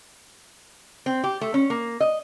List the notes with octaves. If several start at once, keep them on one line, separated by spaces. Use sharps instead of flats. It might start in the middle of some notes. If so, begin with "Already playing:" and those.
C4
G4
A3
C#4
A#3
D#5